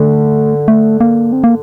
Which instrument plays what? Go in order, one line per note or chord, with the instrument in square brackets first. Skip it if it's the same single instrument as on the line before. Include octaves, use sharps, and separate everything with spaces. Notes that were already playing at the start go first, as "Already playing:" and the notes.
Already playing: [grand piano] D3 [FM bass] A3
[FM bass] A3
A#3
C4
A#3